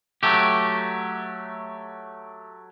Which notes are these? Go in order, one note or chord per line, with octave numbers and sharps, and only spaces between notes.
F#3 A3 G4